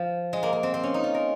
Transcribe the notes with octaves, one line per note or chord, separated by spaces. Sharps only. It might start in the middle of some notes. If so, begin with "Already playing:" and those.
Already playing: F3
G#3
A#3
A#3
C4
C4
C#4
D#4
F4
A#4